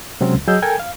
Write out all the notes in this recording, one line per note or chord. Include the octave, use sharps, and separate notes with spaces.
C3 F#3 G#3 C4 C#4
C#2
F#3 G#4 D#5 E6 G6
A4 A#4 G5 G#5 G#6
F5